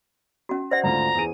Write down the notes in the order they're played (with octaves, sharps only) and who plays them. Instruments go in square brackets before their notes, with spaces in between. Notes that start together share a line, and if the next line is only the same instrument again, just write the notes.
[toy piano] C#4 F#4
[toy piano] C5 D5 F#5 [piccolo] A#6
[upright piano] G#1 D2 F4 [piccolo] A#5
[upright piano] E2 G#4 D#7